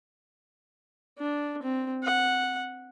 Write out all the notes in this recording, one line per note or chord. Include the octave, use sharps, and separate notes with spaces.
D4
C4
F#5